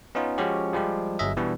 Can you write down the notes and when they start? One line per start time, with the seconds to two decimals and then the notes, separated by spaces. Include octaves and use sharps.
0.15 B3 C#4 D#4 F4
0.38 F3 G#3 C#4 F#4 G4
0.73 F3 G3 G#3 G4
1.19 G1 F#3 G#4 D#5 E5
1.37 B2 E3 G3 B3 D4 F#4